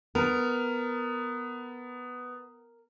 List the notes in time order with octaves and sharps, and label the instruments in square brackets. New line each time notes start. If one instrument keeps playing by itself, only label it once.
[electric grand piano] B3 [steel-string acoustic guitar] A#4